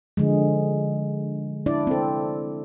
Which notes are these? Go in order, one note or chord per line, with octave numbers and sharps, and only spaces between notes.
D3 F3 G#3
D4 E4 D5
C4 A4